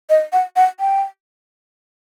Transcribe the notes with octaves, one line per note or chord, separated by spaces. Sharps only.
D#5
F#5
F#5
G5